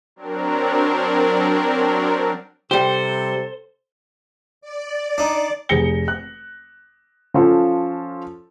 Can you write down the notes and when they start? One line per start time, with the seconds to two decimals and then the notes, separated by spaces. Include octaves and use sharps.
0.16 F#3 C4 D4 A#4
2.71 C3 G3 G4 A4 C5
4.61 D5
5.18 D4 D#4
5.69 F1 G#4 A#6 C#7 G7
6.08 F#6
7.34 F3 C#4 F4 A4